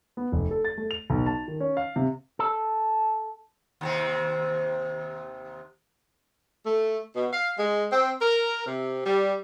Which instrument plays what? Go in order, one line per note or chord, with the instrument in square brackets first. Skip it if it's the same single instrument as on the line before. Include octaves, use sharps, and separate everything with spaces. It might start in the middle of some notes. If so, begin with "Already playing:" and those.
[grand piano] B3
F1
A4
A6
A3
F7
B1
A5
D#3
C#4
F5
C3
[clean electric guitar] A4
[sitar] D#2 C3 C4
[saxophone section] A3
B2
F5
G#3
C4
A#4
C3
G3